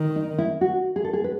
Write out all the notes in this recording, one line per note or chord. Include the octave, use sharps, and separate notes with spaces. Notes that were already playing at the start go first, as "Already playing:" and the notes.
Already playing: D#3
D#4
E4
F#4
G#4
A4
G#4
B4